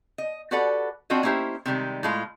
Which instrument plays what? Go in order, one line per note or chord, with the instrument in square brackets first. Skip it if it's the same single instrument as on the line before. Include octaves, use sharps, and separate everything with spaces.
[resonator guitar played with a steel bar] D#5
F#4 G4 A4 B4 D5 F#5
C4 D4 F4 F#4 D#5
A#3 C#4 E4 G4 C5
C3 D#3 G3 G#3
A2 G#3 F4